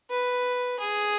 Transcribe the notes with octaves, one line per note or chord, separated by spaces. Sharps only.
B4
G#4